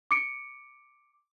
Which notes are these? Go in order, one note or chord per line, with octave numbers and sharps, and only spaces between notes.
D6 C#7 D7